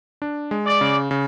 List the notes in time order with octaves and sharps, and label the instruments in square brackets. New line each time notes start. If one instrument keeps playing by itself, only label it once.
[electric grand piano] D4
G#3
[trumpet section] D5
[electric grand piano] C#3
C#3